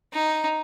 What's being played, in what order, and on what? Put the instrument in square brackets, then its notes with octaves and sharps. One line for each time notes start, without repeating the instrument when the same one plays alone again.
[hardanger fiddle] D#4